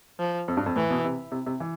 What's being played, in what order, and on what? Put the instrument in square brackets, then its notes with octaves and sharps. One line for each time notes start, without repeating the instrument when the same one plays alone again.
[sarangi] F3
[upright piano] F2
G2
F2
[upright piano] A2 [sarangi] E3
[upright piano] B2
C3
C3
C3
E3